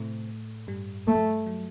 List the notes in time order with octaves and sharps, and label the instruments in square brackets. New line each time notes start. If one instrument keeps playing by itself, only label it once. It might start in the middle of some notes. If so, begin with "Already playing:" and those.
Already playing: [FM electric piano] A2 C3 A3 C4
G2 G3
[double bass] A3
[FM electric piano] F#3